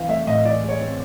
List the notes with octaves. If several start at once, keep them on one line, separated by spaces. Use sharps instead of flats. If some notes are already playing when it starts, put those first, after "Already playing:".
Already playing: E3 C4 F5
A3 E5
A2 D#5
E3 D5
G#3
C#5
C4